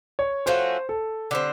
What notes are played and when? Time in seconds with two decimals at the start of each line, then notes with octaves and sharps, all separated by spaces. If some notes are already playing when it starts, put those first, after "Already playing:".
0.19 C#5
0.46 F3 A3 C#4 F#4 C5
0.89 A4
1.31 D3 G3 C4